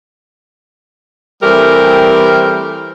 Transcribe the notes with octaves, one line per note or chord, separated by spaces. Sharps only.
E3 G3 A3 C4 G4 A#4